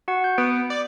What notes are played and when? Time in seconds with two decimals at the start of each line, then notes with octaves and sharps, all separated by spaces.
0.08 F#4 F#5
0.24 G6
0.38 B3 D7
0.70 D5